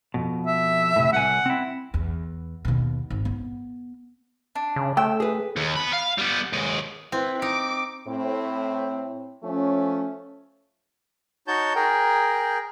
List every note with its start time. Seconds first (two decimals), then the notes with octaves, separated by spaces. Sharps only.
0.14 F2 B2
0.47 E5
0.96 A2 C3
1.13 C2 F#5 G#5
1.46 C4 E4
1.94 E2
2.65 D#2 B2
3.10 G#1
3.25 B3
4.55 D4
4.76 C#3
4.97 A3 G5 E6
5.20 G#4 B4
5.57 D#2
5.76 B3 B5
5.93 F5
6.18 G3 B3
6.53 D#2 G#3
7.12 C4 E4 B4
7.42 D#4 D6 D7
8.08 A2 C4
9.44 F3 A3 C#4
11.47 D#4 F#4 C#5 A5 G6
11.76 G#4 A#4 G5